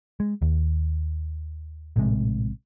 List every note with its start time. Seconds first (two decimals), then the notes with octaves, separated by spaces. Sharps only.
0.20 G#3
0.42 D#2
1.96 A#1 A2 C3 G#3